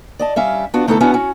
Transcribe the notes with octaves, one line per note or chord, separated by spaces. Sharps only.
D5 D#5 A5
G3 C#4 E5 F5
B3 D4 F4 F#4
D3 A3 B3 D#4 E4 A4
B3 C#4 D4 E4 F#4
C#4 F#4